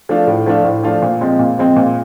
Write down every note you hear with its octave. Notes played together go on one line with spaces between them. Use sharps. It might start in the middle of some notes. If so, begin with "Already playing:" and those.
F3 A3 D4 F4
A2
F3 A3 D4 F4
A2
F3 A3 D4 F4
A#2
F3 G#3 C4
A#2
F3 G#3 C4
A#2